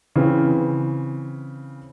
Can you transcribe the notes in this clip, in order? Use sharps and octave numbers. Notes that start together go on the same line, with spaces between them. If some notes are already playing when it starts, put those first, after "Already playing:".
C#3 E3 C4